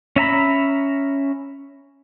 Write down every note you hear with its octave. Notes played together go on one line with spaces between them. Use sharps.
C#4 E5 A#5 B5